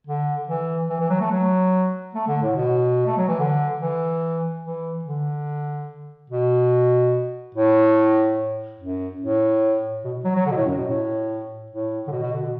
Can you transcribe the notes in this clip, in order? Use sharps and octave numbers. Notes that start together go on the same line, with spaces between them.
D3
E3
E3
E3
F#3
A3
F#3
A3
D3
A2
B2
A3
F#3
E3
D3
E3
E3
D3
B2
A2
F#2
A2
B2
F#3
F#3
D3
B2
A2
F#2
B2
A2
A2
D3
B2
B2
D3
B2